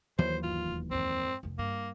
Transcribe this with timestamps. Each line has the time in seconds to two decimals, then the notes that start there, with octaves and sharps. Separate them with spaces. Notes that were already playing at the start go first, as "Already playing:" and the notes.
0.19 D#2 E3 F#3 C5
0.43 G1 F4
0.65 E1
0.91 F2 G#2 C4
1.43 F1 F2
1.58 G2 A#3